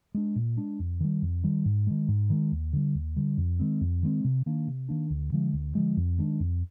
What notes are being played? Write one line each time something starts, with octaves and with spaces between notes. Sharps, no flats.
G#3 D4
A#2
G#3 D4
F2
D#3 G3
F2
D#3 G3
G#2
D#3 G#3
G#2
D#3 G#3
D#2
D3 G3
D#2
D3 G3
F2
D#3 G#3 C4
F2
D#3 G#3 C4
C3
D#3 A#3 D4
C3
D#3 A#3 D4
D2
D3 F3 G#3
D2
D3 F3 G#3
F2
D#3 G#3 D4
F2